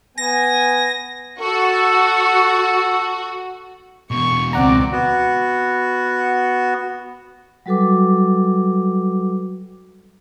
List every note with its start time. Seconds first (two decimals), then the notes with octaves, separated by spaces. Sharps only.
0.18 B3 G#5 A#6
1.40 F#4 A4
4.11 E2 B2 C#6
4.53 C#2 C4 D5 F#5 A#5
4.92 B3 F#4
7.66 F#3 G3 F#4 A4 B4 D6